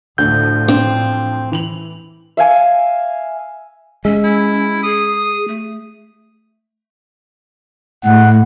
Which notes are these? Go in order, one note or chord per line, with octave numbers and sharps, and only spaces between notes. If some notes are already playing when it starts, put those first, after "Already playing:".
D2 A2 F3 G6
C4 D4
E3 F7 F#7
E5 F5 G#5 D6
G#3 C#4 E5
E4
G#4 D#6
A3
A2 F#5